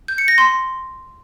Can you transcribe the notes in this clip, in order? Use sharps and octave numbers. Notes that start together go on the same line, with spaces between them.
G6
C#7
A#6
C6